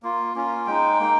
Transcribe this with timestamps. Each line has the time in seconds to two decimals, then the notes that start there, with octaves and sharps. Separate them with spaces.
0.03 A#3 F4
0.35 A#3 C#4 F4
0.66 G#3 D#4 G5
1.00 A#3 D#4